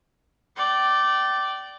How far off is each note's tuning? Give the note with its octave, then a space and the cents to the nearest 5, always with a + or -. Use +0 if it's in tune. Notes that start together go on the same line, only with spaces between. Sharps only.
D5 +0 G5 -30